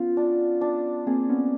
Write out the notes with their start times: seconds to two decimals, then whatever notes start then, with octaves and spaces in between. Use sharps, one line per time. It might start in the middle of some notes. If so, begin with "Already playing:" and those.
Already playing: B3 C#4 F4
0.17 D4
0.61 D4
1.07 A#3 C4 G#4
1.29 B3 C#4